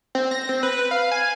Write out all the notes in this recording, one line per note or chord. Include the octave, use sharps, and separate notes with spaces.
C4
A#6
C4
B4
F5
G#5